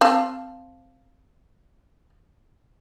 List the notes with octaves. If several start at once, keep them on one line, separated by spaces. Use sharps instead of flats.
C4 F5 A5